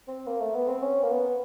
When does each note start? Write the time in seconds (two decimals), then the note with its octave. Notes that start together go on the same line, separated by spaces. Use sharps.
0.08 C4
0.27 A#3
0.41 A3
0.55 B3
0.68 C4
0.82 C#4
1.03 A#3
1.10 B3